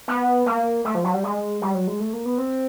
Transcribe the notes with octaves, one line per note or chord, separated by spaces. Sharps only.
B3
A#3
A3
F3
F#3
G3
G#3
G3
F#3
G#3
A3
A#3
B3
C4